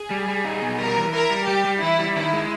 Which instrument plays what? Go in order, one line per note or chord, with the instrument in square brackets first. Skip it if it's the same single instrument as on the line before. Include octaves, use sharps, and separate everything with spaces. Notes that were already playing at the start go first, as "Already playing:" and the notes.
Already playing: [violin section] G#4
[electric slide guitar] G3
G3
D#4
B2
[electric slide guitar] G3 [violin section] A#4
[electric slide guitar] E3
[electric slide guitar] E4 [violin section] A#4
[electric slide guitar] G3
[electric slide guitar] G3 [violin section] G4
[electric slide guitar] G3
[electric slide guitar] E3 [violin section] E4
[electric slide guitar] G3
[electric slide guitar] D#3 [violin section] E4
[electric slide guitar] G#3